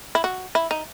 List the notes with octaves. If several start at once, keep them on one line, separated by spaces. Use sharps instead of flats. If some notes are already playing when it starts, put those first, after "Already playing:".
E4
F#4
E4
D#4